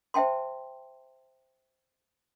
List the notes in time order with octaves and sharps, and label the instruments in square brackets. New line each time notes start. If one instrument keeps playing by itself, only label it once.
[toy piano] C5 E5 G5 A5 C6